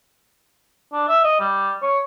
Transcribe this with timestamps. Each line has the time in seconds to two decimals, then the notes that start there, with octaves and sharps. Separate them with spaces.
0.93 D4
1.08 E5
1.24 D#5
1.40 G3
1.82 C#5